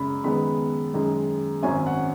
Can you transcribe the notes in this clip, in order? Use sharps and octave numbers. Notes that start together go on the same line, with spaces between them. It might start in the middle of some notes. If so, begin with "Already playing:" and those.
Already playing: F#1 F#2 C#3 G#3 B5
F#2 D#3 G#3 B3 B5
F#2 D#3 G#3
G#1 F#2 F#3 C#4 G#5
F#5